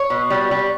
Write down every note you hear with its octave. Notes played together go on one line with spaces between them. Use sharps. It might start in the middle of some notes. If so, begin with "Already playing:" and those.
Already playing: C#5
B2
G3
G3